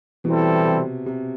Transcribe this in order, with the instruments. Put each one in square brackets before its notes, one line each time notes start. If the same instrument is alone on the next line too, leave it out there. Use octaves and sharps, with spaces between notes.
[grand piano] B2 [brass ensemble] E3 G3 C4 E4 A4
[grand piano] C3
C3